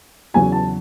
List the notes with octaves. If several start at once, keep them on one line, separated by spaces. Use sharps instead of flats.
E2 C#3 F#3 G#5
A5